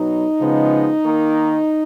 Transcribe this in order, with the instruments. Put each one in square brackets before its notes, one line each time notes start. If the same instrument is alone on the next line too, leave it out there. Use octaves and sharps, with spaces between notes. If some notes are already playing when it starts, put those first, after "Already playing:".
Already playing: [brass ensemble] B2 F#3 B3 D#4
C#3 F3 G#3 B3
D#3 A#3